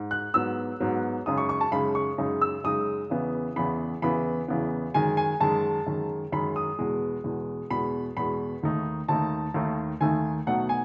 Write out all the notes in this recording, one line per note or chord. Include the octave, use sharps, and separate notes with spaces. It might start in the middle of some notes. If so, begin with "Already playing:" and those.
Already playing: G#2
F#6
G#2 F#3 B3 E6
G#2 F#3 B3
F#2 C#3 G#3 D#4 D#6
C#6
C#6
A5
F#2 C#3 G#3 D#4 B5
C#6
F#2 C#3 G#3 D#4
E6
F#2 C#3 G#3 D#4 D#6
E2 C#3 E3 B3
E2 C#3 E3 B3 B5
E2 C#3 E3 B3 B5
E2 C#3 E3 B3
F#2 D#3 G#3 G#5
G#5
F#2 D#3 G#3 A5
F#2 D#3 G#3
F#2 D#3 G#3 B5
D#6
E2 B2 G#3
E2 B2 G#3
E2 B2 G#3 B5
E2 B2 G#3 B5
D#2 D#3 A3 D#4
D#2 D#3 A3 D#4 A5
D#2 D#3 A3 D#4
D#2 D#3 A3 D#4 G#5
B2 F#3 A3 D#4 F#5
G#5